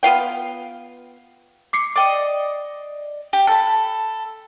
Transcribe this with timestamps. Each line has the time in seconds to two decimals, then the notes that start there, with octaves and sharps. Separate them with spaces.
0.03 B3 F4 F5 G5
1.73 D6 C7 C#7
1.96 D5 D#5 G5 D6 D#6
3.33 G4
3.47 A4 A5 B5